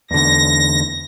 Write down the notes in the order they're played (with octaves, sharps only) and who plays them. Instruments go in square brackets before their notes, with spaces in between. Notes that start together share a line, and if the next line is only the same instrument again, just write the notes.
[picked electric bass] E2 D3 [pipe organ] A#6